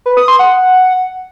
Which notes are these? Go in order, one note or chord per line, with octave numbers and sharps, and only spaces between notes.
B4
D#6
C6
F#5